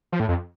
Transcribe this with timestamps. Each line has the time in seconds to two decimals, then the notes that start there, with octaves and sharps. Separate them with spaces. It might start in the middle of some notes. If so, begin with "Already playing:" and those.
0.12 F3
0.20 A2
0.28 F2